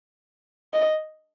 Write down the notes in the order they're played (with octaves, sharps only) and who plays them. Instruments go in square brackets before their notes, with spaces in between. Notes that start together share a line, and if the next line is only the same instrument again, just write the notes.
[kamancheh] D#5